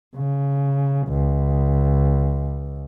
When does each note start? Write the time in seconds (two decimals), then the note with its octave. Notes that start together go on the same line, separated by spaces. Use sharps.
0.16 C#3
1.08 C#2